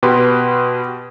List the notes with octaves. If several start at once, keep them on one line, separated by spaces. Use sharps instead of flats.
B2 G4 B4 C6